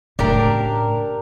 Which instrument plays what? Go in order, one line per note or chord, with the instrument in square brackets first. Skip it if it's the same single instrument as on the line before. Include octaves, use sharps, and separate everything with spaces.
[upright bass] A2 C#3 [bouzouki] D4 G4 A#4